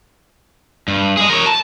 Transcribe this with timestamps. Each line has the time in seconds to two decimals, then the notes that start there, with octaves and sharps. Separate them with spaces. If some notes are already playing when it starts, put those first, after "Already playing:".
0.88 G2
1.17 G#4 D#5
1.29 A#4 C#5
1.46 A5